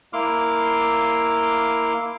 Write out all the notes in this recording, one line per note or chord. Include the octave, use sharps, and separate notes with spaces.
A#3 E4 C6 D6 F6